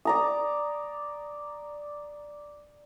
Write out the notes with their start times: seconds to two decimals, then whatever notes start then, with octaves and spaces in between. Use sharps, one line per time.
0.05 D5 A#5 D#6